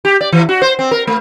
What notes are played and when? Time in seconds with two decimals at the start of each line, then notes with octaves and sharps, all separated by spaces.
0.05 G4
0.21 D5
0.32 E3
0.49 F#4
0.62 C5
0.79 C4
0.91 A#4
1.07 A3